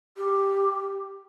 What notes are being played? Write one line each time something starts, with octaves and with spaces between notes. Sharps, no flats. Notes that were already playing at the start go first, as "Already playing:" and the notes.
G4